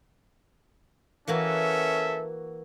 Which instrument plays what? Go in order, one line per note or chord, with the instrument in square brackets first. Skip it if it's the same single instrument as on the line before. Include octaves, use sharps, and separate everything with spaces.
[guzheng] E3 A#3 F#4 [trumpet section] C#4 A4 E5